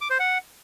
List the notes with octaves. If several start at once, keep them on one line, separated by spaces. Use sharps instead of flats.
D6
C5
F#5